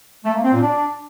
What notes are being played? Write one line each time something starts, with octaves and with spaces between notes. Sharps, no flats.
A3
A#3
C4
A#2
D4